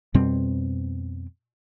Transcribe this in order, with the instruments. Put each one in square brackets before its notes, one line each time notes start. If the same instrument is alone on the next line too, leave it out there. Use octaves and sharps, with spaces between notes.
[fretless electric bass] F2 B2 G3 C4